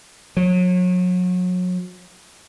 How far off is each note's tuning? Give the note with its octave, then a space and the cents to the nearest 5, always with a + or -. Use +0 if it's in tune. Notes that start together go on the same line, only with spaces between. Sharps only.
F#3 -35